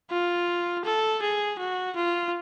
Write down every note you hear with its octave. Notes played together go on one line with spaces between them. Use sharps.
F4
A4
G#4
F#4
F4